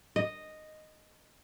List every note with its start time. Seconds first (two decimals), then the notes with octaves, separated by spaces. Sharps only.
0.16 D#5